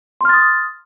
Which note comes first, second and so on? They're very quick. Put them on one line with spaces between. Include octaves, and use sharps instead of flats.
C6 F6 A6 D#6